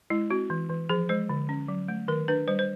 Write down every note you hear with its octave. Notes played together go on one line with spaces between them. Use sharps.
G#3 E4
C4 F#4
E3
E3
F3 G#4
G#3 C5
D3
C#4
F#3
A3
D#3 A#4
D4 B4
G3 C5
C5